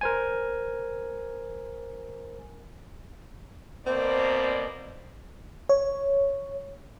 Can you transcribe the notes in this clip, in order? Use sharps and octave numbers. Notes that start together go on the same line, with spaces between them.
A#4 C5 G#5
B2 A#3 C4 D5
C#5